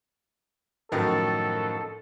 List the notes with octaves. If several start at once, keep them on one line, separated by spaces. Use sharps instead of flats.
F#2 A2 D#3 F3 F#3 A4